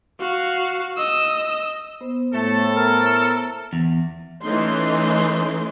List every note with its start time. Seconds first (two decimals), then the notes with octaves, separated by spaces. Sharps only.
0.19 F#4 F5
0.97 D#5 E6
2.01 B3 C5
2.34 A2 A3 A4 A5
2.76 A#4
3.73 E2
4.42 E3 A3 C#4 D#4 C6